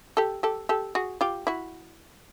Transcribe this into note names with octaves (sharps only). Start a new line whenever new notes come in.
G4 A4
G4 A4
G4 A4
F#4 G#4
F4 G4
E4 F#4